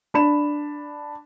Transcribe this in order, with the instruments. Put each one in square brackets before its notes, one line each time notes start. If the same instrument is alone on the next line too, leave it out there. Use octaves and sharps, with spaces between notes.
[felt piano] D4 B5 E7